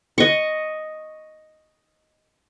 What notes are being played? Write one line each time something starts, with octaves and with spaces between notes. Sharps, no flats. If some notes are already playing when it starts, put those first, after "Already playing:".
D#5 C#6